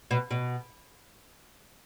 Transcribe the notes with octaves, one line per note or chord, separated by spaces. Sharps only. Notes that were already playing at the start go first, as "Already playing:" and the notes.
B2
B2